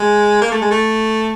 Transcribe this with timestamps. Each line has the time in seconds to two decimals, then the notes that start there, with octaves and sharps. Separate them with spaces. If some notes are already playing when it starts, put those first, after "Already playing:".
Already playing: G#3
0.41 A#3
0.52 A3
0.61 G#3
0.71 A3